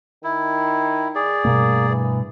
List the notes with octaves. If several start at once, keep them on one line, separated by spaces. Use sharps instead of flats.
D#3 E4
G#4 D5
G2 B2 A3 A#3
E3